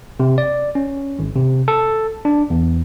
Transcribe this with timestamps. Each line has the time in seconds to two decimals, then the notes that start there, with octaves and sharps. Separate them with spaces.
0.20 C3
0.38 D5
0.75 C#4
1.19 G#1
1.36 C3
1.68 A4
2.25 D4
2.50 E2